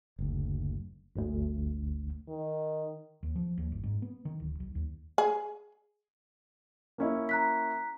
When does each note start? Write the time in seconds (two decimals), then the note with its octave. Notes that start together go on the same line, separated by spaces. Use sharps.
0.19 F#1 D2
1.16 G1 D2
2.28 D#3
3.23 D#2
3.36 F3
3.58 D#2
3.72 G1
3.83 G#2
4.02 B3
4.25 D#3
4.40 D1
4.60 B1
4.75 D#2
5.18 G#4
6.98 A#3 C#4 E4
7.29 A#5 F#6 B6